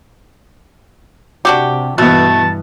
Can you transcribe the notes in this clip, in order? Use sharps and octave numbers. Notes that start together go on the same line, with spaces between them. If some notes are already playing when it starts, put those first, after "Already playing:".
C3 D4 F#4 G4 D6
G2 B2 E3 A3 B3 A5